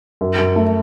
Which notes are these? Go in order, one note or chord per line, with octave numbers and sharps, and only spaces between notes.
F#2
F#2
A3